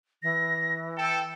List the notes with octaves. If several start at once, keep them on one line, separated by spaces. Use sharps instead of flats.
E3 A#6
A4 G5